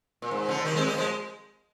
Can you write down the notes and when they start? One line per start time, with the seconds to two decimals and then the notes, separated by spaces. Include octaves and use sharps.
0.22 A#2
0.31 G#2
0.49 D3 F3
0.65 D#3 G3
0.75 G#3 C4
0.87 G3 A#3
0.98 F3 G#3